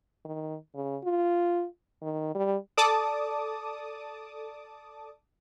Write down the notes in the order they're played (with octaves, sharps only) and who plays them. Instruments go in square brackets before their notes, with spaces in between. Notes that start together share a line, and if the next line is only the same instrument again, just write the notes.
[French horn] D#3
C#3
F4
D#3
G3
[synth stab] A4 D5 A5 D6 D#6